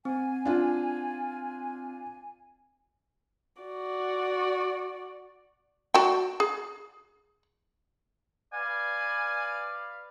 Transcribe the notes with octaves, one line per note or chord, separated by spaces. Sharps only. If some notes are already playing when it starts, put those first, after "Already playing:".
C4 G#5
D4 F4
F#4 D5
F#4 D5 G5
G#4
B4 D5 F5 G#5